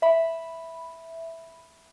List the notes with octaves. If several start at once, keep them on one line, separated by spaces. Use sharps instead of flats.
E5 B5